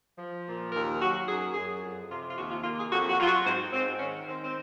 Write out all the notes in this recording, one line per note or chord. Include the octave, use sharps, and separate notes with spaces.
F3
A#2
D#2 A#4
F#3 F#4
F#2 G#4
F#2 G#4
F2
C3 F4
F4
D#2 F#4
F4
A#3 F4
G#4
F2 F#4
F#4
F#3 F4
F#4
G#2 C4
G#2 C4
D#3 C#4
D#3 C4
C4